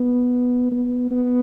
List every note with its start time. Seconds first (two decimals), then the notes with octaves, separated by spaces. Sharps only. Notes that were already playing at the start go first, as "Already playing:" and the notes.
Already playing: B3
0.72 B3
1.11 B3